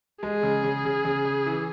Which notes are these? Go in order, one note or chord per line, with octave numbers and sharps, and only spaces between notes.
G#3 G#4
C#3
C#3
C#3
C#3
C#3
E3